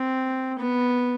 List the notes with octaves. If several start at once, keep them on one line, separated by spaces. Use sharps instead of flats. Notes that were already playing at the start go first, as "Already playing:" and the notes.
Already playing: C4
B3